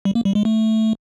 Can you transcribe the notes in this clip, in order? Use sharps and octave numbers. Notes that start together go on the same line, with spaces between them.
G3
A#3
G3
G#3
A3